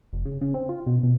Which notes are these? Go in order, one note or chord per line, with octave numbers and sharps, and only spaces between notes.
F1
C#3
C#3
C4
F4
B2
B2